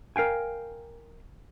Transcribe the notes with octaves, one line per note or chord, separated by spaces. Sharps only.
A#4 F5 G5 G#5